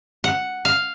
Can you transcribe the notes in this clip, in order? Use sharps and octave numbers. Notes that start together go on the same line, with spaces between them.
F#5
F5